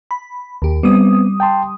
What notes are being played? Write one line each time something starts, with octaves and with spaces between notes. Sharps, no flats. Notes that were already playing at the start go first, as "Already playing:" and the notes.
B5
D#2 G4
G3 B3 C4 D#6
G5 A5 C6